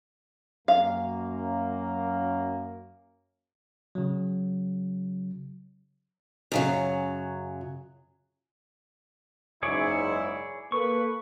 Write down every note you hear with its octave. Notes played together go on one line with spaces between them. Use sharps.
F#2 A#3 F5
C#3 F#3
F#2 C#3 F#3
F#1 G#2 E4 G#4 C#5 D5
A#3 A4 B4 C#6